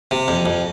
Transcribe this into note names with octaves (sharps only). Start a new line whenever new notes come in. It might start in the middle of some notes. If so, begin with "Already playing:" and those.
C3
F2
F2